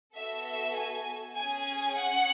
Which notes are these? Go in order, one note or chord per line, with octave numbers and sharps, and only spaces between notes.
B3 F#4 A4 E5
E5
G#5
C#4 G#4 G#5
F#5